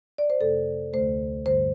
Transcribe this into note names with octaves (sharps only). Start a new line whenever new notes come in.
D5
C5
F2 C3 A3 A4
D2 D3 A3 C5
G2 D3 G3 C5